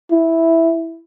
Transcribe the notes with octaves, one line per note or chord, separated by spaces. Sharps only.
E4